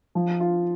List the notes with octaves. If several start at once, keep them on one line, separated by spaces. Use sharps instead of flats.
F3
F4